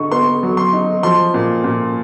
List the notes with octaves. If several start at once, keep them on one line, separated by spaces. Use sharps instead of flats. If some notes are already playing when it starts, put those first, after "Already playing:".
Already playing: D3 D#4 C#6
B3 C6
F#3
C6
D#4
F3 C6
A#2
A#2